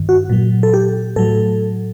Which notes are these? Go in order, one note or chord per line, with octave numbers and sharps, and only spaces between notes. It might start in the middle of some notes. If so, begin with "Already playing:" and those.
Already playing: G2 D#3
F#4
A#2 F#3
A4
G4
A2 F#3 A4